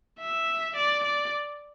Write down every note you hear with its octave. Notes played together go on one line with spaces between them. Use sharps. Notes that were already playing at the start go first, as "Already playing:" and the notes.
E5
D5
D5